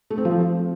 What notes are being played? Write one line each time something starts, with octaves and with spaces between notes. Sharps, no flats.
A3
C4
F3